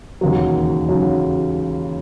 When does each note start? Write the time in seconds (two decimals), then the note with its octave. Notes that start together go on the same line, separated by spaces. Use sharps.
0.21 E1 D#2 C#3 F#3
0.89 C#3 F#3